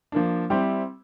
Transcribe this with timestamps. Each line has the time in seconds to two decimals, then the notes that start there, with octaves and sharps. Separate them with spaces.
0.12 F3 A#3 D4
0.50 G3 C4 E4 G4 C5